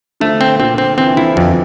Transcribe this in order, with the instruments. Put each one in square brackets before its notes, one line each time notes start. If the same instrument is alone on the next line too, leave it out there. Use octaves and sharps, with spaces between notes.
[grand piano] D3 F3 [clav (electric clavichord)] A3
[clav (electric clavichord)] C4
[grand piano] A#2 D3 [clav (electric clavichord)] C4
[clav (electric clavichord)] C4
[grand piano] C3 E3 [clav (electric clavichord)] C4
[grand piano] D3 F3 [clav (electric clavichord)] E4
[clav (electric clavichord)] F2 [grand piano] C3 E3